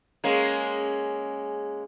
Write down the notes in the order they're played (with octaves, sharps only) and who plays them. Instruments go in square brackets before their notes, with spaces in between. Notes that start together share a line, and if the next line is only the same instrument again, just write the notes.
[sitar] G#3 A#3 C#4